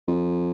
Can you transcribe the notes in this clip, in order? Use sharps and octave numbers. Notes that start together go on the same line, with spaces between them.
F2